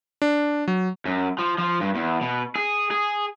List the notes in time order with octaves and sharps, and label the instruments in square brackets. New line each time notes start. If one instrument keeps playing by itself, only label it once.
[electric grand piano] D4
F#3
[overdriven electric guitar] F#2
F3
F3
G2
E2
B2
G#4
G#4